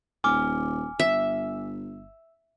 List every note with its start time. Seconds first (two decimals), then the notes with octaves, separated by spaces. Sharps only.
0.24 D#1 G#5 D6 F6
0.99 G1 E5